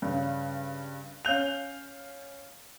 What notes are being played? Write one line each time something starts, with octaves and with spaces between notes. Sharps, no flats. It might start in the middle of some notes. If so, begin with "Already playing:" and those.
G2 C#3
C#4 F5 G6 F7